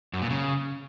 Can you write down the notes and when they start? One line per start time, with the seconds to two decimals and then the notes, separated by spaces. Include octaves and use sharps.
0.13 F#2
0.22 A#2
0.30 C#3